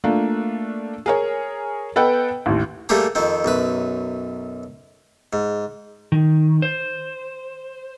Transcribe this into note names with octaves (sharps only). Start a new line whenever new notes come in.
A3 A#3 D4 F4
G#4 A#4 C#5
B3 A4 B4 D#5 F#5 G5
A1 D#2
G3 A3 A#3 G4 G#4
F2 D#3 C4
B1 F#2 B4
G#2
D#3
C5